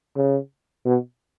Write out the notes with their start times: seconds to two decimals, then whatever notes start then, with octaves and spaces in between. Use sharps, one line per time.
0.15 C#3
0.85 B2